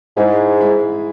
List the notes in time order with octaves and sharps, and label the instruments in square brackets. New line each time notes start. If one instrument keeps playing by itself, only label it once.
[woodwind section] G#2 [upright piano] G#3 E4 G#4
[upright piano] G#3 E4 G#4